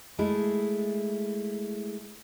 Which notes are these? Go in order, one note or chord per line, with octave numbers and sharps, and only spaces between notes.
G#3 A3 E4